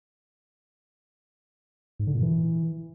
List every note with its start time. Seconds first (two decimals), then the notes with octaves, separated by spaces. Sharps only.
2.00 G#2
2.07 D3
2.15 A#2
2.22 E3